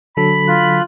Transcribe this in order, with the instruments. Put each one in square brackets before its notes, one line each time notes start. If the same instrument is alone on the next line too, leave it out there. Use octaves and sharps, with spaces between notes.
[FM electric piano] D3 F#3 A4 [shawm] B5
[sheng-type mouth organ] F4 F#6